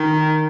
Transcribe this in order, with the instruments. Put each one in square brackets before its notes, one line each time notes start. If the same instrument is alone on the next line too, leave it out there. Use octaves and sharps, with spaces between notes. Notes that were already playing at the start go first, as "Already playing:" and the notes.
Already playing: [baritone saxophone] D#3